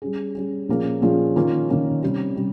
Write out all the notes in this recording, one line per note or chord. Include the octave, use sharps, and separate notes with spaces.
G3 C#4 G#4
G3 C#4 G#4
A#2 F3 A#3 C#4 G#4
A#2 F3 A#3 C#4 G#4
D#3 A#3 C#4 F4
D#3 A#3 C#4 F4
C3 G3 C#4
C3 G3 C#4